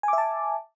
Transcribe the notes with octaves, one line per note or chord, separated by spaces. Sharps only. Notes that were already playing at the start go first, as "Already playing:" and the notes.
E5 G#5 A5 D6